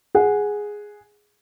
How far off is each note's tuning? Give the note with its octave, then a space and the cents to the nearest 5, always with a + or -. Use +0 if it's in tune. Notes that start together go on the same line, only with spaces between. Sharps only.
G#4 +0 F#5 -10